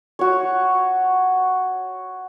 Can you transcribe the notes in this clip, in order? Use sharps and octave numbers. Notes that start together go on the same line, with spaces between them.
F#4 C#5